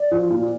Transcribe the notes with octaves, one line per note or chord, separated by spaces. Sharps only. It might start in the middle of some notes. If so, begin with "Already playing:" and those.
Already playing: D5
F3
A#2